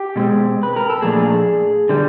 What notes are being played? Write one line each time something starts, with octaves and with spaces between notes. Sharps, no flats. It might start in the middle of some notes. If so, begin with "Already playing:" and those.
Already playing: G4
B2 G#3 C4
B4
A#4
A4
A#2 F3 A3 D4 G#4
D3 G3